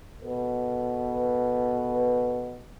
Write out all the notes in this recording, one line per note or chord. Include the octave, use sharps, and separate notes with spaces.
B2 A4 B4